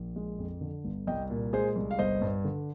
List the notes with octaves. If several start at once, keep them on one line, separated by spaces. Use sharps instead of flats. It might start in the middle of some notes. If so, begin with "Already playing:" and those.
Already playing: A#1
G#3
F2
D3
G1
C2 D#5 G5
A#2
G#3 G#4 C5
C2
F5
G1 C5 D#5
G2
D3